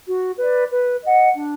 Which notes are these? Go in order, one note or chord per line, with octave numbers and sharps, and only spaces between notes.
F#4
B4 D5
B4
D#5 F#5
D4